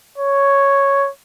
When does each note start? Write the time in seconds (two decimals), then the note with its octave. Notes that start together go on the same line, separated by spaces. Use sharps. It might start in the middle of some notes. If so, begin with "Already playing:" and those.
0.18 C#5